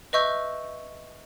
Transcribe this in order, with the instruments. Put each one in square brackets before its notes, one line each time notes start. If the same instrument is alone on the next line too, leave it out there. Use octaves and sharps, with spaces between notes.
[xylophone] B4 D#5 E5 C#6 E6 G6